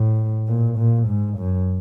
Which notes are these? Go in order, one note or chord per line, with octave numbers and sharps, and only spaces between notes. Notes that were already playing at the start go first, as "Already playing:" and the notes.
Already playing: A2
A#2
A#2
G#2
F#2